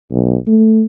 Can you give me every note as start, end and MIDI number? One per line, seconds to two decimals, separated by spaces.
0.11 0.36 35
0.47 0.84 57